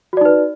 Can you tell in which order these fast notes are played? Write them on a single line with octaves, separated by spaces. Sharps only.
F#4 D5 D#4 B4